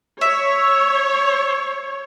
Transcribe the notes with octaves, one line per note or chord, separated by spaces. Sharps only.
C#5 E5